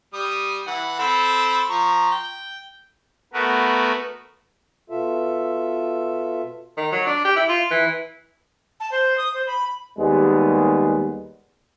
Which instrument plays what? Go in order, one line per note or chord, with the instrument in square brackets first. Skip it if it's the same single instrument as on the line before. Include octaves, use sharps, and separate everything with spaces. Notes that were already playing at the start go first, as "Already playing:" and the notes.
[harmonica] G3 D#6
E3 F#5
C4 A4 B5
F3 A#5 C#6
G5
[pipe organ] A3 B3 F#4 A#4 B4
[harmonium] B2 F4 A4 E5
[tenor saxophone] D#3
F#3
D4
G4
E4
F4
E3
[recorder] A5
C5
D#6
C5
B5
[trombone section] D#2 G3 G#3 B3